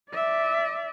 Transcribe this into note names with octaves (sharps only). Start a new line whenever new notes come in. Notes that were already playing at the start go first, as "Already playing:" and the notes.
D5 E5